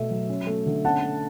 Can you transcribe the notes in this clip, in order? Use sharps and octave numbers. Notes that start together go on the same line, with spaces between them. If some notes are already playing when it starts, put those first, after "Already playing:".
Already playing: B2 A3 E5
F#3
C#4
A3
D3
C#4 F#5 A5
A3